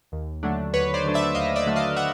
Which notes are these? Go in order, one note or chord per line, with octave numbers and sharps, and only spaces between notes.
D#2
D3 F#3 A3 D4
D#2 B4 C#5
C5 D5
D3 F#3 A3 D4
D5 E5
D#2 D#5 F5
D5 E5
D3 F#3 A3 D4
D#5 F5
E5 F#5